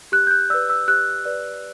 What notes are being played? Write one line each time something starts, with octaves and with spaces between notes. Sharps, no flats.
G4 F#6
G6
F#6
B4 D5 E6
E6
G4 F#6
B4 D5